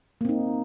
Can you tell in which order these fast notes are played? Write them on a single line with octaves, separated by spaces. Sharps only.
A#3 C4 D#4